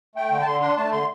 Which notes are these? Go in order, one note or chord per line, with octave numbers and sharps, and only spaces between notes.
A3 G5
D3
A5
D3 C6
D4 C6
A3 A5
D3 C6